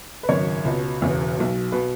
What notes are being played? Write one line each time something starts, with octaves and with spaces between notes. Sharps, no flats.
B4
G#1 F#2 C#3 C#5
C#2 B2
E1 E2 C#3
B1 B2
B2 B4